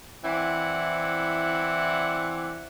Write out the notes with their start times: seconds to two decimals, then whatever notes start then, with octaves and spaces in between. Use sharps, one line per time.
0.24 E3 C4 E4 D5 F#5